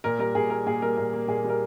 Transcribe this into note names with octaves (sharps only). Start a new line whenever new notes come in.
A#2 A#4
G3 A#4
A#2 G#4
A#3 A#4
A#2 G#4
G3 A#4
A#2 A#4
A#3
A#2 G#4
G3
A#4